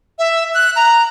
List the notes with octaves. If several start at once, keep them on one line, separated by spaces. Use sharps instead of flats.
E5
F#6
A#5